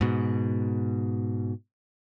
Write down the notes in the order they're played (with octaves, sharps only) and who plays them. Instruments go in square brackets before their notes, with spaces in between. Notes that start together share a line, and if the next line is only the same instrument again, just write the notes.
[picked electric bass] G#2 B2